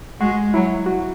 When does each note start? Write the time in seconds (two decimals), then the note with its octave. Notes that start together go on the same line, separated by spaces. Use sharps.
0.20 G#3 F#4
0.54 F#3 E4
0.86 F#4